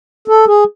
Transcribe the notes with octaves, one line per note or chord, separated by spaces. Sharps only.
A4
G#4